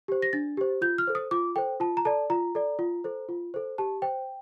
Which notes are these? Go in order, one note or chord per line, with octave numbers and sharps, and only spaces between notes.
G4 C5
A#6
D4 A6
G4 C5
F4 G6
F6
A4 C5
D#6
F4 D6
A4 C5 G5
F4 A5
A#5
A4 D5 A5
F4 A#5
A4 D5
F4
A4 C5
F4
A4 C5
G4 A5
C5 G5